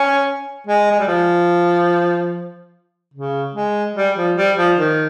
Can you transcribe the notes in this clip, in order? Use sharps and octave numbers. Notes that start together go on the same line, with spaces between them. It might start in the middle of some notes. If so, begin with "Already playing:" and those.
Already playing: C#4
G#3
G#3
G3
F3
C#3
G#3
G3
F3
G3
F3
D#3